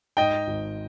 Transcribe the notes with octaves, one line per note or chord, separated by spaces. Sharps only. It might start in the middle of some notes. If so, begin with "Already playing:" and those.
G#2 D#5 G5
G#1